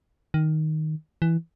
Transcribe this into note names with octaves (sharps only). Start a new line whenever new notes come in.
D#3
E3